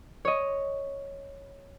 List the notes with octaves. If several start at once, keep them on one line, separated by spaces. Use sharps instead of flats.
C#5 D#5